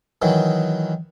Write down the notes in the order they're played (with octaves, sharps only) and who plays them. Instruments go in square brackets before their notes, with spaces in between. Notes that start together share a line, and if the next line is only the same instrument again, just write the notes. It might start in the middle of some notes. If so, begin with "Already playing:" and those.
[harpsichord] D#3 E3 F#3